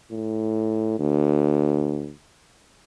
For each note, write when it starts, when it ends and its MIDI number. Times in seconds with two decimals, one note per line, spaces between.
0.11 0.98 45
0.99 2.13 38